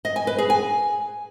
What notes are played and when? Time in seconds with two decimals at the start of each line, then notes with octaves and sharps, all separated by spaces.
0.05 D#5
0.16 G#5
0.27 B4
0.38 G#4
0.50 G#5